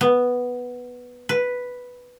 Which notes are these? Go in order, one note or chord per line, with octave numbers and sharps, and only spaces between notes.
B3
B4